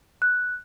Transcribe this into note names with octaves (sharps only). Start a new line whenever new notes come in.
F#6